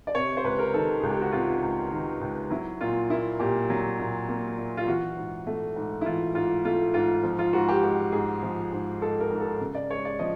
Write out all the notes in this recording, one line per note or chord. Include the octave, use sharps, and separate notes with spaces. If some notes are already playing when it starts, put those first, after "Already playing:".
D5
C3 C#5
C5
C#2 B4
A#4
D#3 A4
C#2 G#4
G4
F#4
C3 F4
C#2
D#3
C#2
F#3 E4
A#2 F4
A#3 E4
A#2 G4
F#3
A#2
A#3
A#2
F4
E3 F#4
G#2
A3
G#2
E4
E3 F4
G#2 F4
A3 F4
G#2 F4
F3
F4
G#2 F#4
G4
G#3 G4
G#2 G#4
F3
G#2
G#3 A4
A#4
G#2
A4
C#3
D5
G#3 C#5
D5
F3 D#5